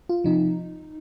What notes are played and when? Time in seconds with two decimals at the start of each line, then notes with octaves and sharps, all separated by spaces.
0.09 F4
0.24 C3 F3 D#4